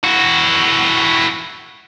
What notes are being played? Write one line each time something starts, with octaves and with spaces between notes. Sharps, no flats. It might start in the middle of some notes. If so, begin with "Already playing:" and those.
E4 F#4